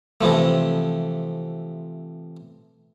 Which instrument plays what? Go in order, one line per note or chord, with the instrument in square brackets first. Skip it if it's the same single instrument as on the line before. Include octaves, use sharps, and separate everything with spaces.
[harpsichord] C3 E3 F3 A3